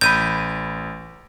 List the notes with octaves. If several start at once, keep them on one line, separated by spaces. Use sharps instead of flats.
A1 B5 G6 D#7